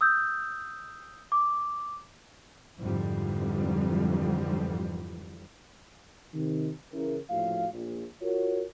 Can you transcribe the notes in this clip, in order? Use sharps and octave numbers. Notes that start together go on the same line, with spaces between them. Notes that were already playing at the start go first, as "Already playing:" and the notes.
D#6 E6 G6
D6
F2 G#2 D3 E3 F3 G3
C3 D#3
C#3 E3 E4 A#4
A#1 A2 F3 F#4 F5
A#1
F4 F#4 A#4 C#5